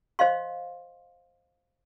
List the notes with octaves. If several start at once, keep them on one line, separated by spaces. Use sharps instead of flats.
C5 D#5 F5 C6